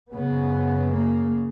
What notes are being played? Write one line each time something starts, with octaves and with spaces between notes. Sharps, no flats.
F#2 C#3 B3
A#3